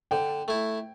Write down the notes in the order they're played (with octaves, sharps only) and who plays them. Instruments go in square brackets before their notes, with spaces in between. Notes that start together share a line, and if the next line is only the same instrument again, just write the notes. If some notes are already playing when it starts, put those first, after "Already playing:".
[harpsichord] D3 [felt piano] G5
[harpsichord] A3 E4